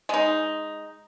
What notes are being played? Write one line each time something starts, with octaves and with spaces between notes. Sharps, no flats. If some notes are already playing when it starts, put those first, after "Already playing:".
G#3 D#4